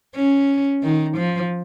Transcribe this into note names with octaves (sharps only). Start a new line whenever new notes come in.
C#4
D#3
F3